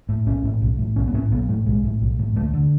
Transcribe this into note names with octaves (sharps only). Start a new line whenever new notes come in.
A2
B1 C#4
A2
B1
A2
B1 C#4
B3
A2 C#4
B1 B3
A2 A3
B1 G#3
A2
B1
A2
D2 A3
D3